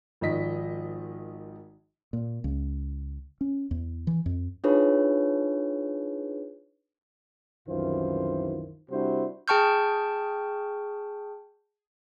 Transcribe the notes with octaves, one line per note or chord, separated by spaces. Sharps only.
G#1 D#3 F3 D#5 B6
A#2
C#2
C#4
E2
E3
F2
D4 D#4 F4 G#4 B4 C#5
C2 F#2 D#3 E3 F4 C5
C3 G3 D4 E4 F#4 C5
G#4 G5 A5 C#6 F6 G6